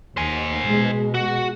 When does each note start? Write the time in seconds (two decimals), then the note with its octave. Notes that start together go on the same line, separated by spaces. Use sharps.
0.17 D#2 C5 G#5
0.67 B2 G#3
1.15 F#4